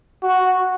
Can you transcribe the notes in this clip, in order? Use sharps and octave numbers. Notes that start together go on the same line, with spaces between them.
F#4